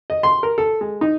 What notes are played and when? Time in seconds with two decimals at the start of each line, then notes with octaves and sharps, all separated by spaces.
0.10 D#5
0.23 C6
0.43 A#4
0.58 A4
0.81 G#3
1.01 D#4